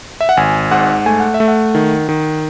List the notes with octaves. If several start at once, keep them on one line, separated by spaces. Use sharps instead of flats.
E5
F#5
G#1 G#5
G#2 F#5
A3 G#5
F#5
E5
A3
F#5
D#3
D#3